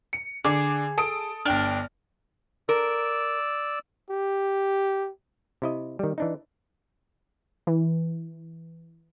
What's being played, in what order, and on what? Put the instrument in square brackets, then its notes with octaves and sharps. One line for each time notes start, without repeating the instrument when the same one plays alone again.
[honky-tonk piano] C#7
[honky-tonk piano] D3 D6 [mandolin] G#4
[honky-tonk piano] A4 D#6 D7
[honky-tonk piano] G1 G5 F6 [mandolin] D4
[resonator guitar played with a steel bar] A#4 [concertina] D5 E6
[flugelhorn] G4
[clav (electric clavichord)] C3 E4 D#5
D#3 G3
E3 D4 D#4
[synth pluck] E3